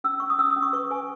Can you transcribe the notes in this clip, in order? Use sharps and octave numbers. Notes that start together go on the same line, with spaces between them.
C#4 E6
C#4 C#6
D#6
C#4 E6
D#6
C#4
C#6
B4 C#6
B4 G#5